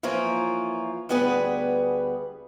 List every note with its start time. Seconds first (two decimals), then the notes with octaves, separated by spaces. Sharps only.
0.03 E3 F3 A#3 F4 A#4 C#5
1.09 D2 G3 B3 G#4 B4